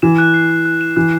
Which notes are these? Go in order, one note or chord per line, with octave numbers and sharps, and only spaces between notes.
E3 E7
F#6
C7
F#6
F#6
E7
E3 F#6